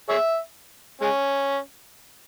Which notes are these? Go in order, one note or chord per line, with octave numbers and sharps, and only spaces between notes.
G#4 C#5 E5
G#3 C#4